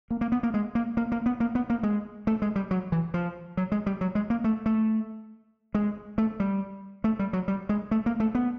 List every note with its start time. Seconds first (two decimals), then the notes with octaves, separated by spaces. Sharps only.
0.11 A#3
0.21 A#3
0.32 B3
0.43 A#3
0.54 G#3
0.75 A#3
0.97 A#3
1.12 A#3
1.26 B3
1.40 A#3
1.55 B3
1.70 A#3
1.83 G#3
2.27 A3
2.42 G#3
2.56 G3
2.71 F#3
2.92 E3
3.14 F3
3.57 F#3
3.72 G#3
3.86 G3
4.01 F#3
4.15 G#3
4.30 A#3
4.44 A3
4.66 A3
5.75 G#3
6.18 A3
6.40 G3
7.04 A3
7.19 G3
7.33 F#3
7.48 G3
7.69 G#3
7.91 A3
8.06 A#3
8.20 A3
8.35 B3